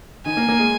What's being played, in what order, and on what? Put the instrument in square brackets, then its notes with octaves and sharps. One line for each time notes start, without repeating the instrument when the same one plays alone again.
[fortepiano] D#3 [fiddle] G#5
[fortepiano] A#3
A#3
G#3